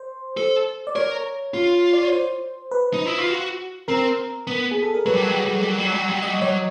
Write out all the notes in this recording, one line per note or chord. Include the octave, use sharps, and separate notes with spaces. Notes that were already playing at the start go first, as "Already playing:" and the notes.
Already playing: C5
A4
D5
A#4 C#5
F4
D5
C#5
C5
B4
D#4
E4
F4
F#4
C4 A#4
B3
G#4
A4
A#4
F#3 B4
G3
F#3
G3
F#3
G3
F#3
G3
F#3
G3
F#3
G3
F#3
G3
F#3
G3 D#5
F#3
G3 C#5
F#3